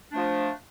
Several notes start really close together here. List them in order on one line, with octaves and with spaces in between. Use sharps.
D4 A3 F3